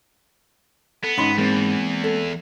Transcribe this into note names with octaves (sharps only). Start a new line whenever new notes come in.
B3 A4
G#2 C#4 D#4 B5 C6
E2 G#3 A#3 C4
A4